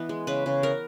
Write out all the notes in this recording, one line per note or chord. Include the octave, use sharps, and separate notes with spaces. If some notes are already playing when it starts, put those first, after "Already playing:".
Already playing: E3 B3 D#5
G#3
C#3 B4
C#3
B3 A#4